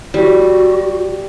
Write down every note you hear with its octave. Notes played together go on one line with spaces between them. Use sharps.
G3 F#4